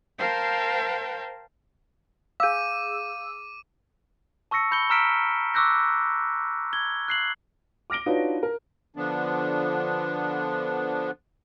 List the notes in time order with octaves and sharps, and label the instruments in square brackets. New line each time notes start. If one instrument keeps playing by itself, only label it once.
[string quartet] A#4 C5 F5 G5 A5
[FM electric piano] G#4 E6 [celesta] F5 G6 [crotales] D6 D#7
[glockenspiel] A5 C#6 E6 A#6 C#7
B5 G6 C#7 G7
A#5 E6 F6 B6 D7 E7
C#6 D6 E6 F#6 G6 A#6
G#6 G7
F#6 C7 F#7
[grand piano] D6 F6 A#6 D7 G7
D4 D#4 F4 F#4 B4 C#5
A#4
[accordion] D3 F3 B3 D4